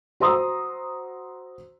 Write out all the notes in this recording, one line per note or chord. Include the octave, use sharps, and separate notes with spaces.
F#4 C5 A#5 C6 D#6 E6